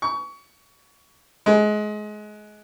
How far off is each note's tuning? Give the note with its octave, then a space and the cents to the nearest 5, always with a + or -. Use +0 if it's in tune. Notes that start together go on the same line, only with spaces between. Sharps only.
C#6 +25
G#3 +25